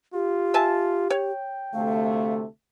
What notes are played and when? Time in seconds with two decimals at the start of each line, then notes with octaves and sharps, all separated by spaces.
0.14 F4 G4
0.54 E5 G#5 A5
1.10 C#5 G5
1.74 D2 C3 A3 F5